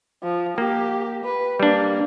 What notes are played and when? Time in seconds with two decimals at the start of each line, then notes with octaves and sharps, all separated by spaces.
0.23 F3
0.58 A#3 G4
1.24 B4
1.60 G3 A#3 D4